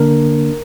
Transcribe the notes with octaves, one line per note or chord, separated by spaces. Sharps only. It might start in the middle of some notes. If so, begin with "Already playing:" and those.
Already playing: D3 A#3 D4 A#4